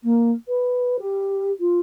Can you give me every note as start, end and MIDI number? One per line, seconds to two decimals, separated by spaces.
0.03 0.31 58
0.48 0.96 71
0.99 1.49 67
1.60 1.80 65